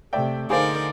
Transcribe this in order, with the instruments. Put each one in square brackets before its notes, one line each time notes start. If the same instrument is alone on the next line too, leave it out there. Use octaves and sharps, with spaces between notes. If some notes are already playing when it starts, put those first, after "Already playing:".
[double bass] C3 A3 [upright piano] D5 E5 G5
[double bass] D3 [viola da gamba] D#4 A#4 D5 [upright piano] G#4 C5 F5